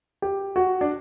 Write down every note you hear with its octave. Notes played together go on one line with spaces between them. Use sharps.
G4
F#4
D4